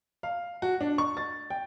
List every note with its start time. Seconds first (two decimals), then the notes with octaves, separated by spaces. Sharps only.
0.23 F5
0.62 F#4
0.81 D4
0.98 C#6
1.17 A6
1.50 G5